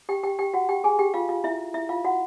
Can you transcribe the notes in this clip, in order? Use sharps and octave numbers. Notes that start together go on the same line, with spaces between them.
G4 G5
G4 G5
G4 G5
F#4 F#5
G4 G5
G#4 G#5
G4 G5
F4 F5
F4 F5
E4 E5
E4 E5
F4 F5
F#4 F#5